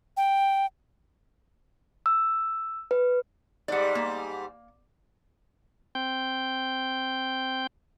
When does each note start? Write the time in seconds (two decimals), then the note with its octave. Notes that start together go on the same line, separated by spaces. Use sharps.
0.17 G5
2.06 E6
2.91 B4
3.68 G#2 G3 D5 F#5
3.95 A#3
5.95 C4 G5 G6